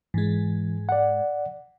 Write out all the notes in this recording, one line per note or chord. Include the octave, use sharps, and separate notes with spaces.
G#2 E3 G#3
D5 F#5